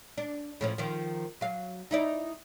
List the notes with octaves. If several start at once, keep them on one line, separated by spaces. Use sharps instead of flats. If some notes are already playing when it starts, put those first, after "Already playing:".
D4
A2 F3 C#4
D#3 F3
F#3 F5
D#4 E4 D5